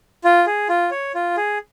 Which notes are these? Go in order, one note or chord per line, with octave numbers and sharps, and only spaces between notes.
F4
G#4
F4
C#5
F4
G#4